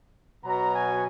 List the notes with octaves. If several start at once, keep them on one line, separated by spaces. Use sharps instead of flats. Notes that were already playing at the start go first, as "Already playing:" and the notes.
B2 F#3 B3 A#5
G#5